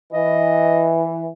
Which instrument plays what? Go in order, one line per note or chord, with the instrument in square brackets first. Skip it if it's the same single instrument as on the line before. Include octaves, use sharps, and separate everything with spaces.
[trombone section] E3 [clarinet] D#5